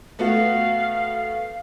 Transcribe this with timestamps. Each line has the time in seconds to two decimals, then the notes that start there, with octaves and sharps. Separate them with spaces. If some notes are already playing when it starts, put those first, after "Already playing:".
0.19 A3 B3 F#4 F5